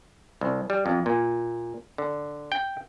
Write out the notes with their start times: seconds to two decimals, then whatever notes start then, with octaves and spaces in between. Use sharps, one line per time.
0.41 C2
0.70 G3
0.86 F2
1.06 A#2
1.98 D3
2.52 G5